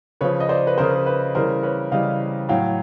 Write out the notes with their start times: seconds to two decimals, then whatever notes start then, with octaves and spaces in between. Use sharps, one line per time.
0.21 C#3 F3 B4 C#5
0.40 D#5
0.49 C5 D5
0.67 B4
0.78 C#3 F3 A#4 C5
0.95 A#4
1.06 B4
1.35 C#3 E3 G3 A#4 C5
1.63 B4 C#5
1.92 C#3 E3 G3 D#5 F5
2.49 A2 F#3 F5 G5